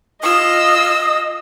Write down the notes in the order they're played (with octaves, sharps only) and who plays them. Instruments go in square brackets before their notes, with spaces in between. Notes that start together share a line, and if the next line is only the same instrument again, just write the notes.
[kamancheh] F4 E6 [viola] D#5 [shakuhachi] D#6